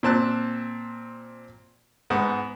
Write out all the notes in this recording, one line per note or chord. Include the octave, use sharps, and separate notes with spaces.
A#2 C4 A5 F#6
G#2 B3